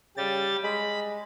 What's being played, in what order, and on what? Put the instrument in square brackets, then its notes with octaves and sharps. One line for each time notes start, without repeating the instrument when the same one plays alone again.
[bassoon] C#3 [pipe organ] G3 G4 A6
[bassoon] G#3 [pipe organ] B5